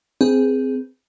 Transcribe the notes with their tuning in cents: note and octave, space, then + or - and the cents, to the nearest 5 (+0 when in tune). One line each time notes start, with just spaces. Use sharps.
C4 -10 G#4 +0 B4 -35